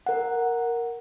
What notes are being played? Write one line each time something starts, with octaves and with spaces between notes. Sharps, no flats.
A#4 F#5